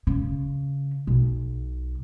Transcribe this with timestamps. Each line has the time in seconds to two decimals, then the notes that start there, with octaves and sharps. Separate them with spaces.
0.07 C#3
1.07 B1